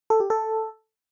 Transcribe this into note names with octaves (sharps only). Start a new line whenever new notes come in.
A4
G4
A4